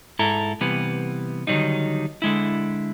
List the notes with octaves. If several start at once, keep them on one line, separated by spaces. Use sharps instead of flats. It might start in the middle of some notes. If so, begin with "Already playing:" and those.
G#2 E4 A4 A#5
C3 E3 G3 B3
D3 D#3 F#3 G3 D#4
D3 G#3 E4